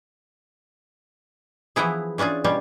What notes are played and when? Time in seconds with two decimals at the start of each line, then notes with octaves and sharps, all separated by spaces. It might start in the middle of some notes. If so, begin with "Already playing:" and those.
1.76 E3 F3 B3 E4 G#4
2.18 E3 C#4 D4 F4 G#4
2.44 B2 G3 C#4 F4 G4